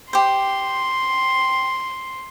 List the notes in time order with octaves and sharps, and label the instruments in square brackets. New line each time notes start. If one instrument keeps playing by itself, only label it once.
[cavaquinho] G4 C5 [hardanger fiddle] C6